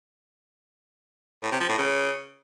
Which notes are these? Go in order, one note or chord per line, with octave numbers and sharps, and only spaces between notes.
A2
C3
F3
A2
C#3